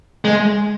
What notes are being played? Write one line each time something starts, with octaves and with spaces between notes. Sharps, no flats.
G#3